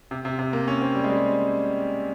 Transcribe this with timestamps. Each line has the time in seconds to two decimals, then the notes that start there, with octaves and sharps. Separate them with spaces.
0.11 C3
0.25 C3
0.39 C3
0.53 A#3
0.68 C#4
0.81 C4
0.95 G3
1.04 G#3
1.09 G3